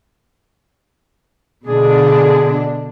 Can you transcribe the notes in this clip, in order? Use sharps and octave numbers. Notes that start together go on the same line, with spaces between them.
B2 D3 D4 G#4